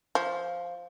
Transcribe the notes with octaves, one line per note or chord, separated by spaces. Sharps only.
F3